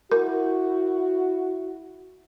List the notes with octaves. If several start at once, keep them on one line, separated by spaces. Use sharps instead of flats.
E4 F#4 A#4